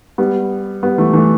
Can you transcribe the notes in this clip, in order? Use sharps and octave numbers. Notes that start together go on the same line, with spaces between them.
G3 B3
G3 B3
E3 A3
E3 A3